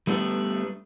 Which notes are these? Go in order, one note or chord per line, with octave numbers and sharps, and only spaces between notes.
G3 A3 B3 D4